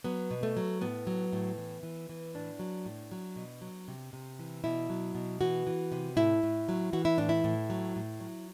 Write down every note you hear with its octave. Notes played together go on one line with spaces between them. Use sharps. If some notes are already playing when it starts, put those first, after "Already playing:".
F#3 B3
B2
A3
F#3
A2 B3
F#3
A2
E3
E3
E3
A2 D4
F#3
A2
F#3
B2
F#3
C3
C3
E3
B2 E4
F#3
B2
E3 F#4
E3
C3
A2 E4
A2
F#3
E3 F#4
E4
A2 D4
E4
A2
F#3
A2
F#3